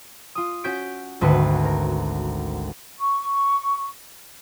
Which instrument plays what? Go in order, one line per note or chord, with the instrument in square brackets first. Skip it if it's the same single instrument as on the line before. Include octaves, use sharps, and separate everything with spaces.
[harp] F4 D#6
C#4 F#4 G6 B6 D7
G#1 D2 F#4 B4
A#4
[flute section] C#6